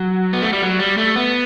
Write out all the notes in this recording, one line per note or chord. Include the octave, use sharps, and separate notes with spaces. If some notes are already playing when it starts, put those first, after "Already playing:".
Already playing: F#3
B3
A3
G3
F#3
G3
A3
B3